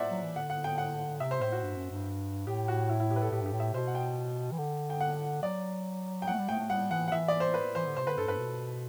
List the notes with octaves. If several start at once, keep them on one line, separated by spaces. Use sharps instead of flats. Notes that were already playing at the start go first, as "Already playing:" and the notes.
Already playing: C5 D5 E5 F#5
F#3
E3
D3 F#5
F#5
G5
F#5
C3 E5
C5
A2 C5
F#4
G2
F#2
G2
A2 G4
F#4
E4
E4
G4
B4
A4
A2 G4
G2 G4
A2
E5
B2 C5
F#5
G5
E3
D3
G5
F#5
F#3 D5
G5
F#3 A3 F#5
G3
A3 G5
A3
G3 F#5
E3 F#5
F#5
E3 E5
D5
C5
B4
E3 C5
D3
C3 C5
D3 B4
G2 A4
G2 B4
B2